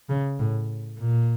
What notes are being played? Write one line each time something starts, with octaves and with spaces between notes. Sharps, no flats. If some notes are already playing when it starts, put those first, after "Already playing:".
C#3
A2
A#2